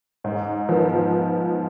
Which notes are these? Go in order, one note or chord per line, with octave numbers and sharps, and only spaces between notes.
G#2
F3 B3